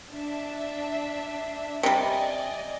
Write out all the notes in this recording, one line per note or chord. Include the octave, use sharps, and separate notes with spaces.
D4 E5
C3 G3 D5 D#5 G#5